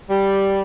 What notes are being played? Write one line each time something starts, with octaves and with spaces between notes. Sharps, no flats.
G3